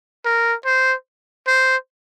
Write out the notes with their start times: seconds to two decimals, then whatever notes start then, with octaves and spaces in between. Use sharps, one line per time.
0.25 A#4
0.66 C5
1.48 C5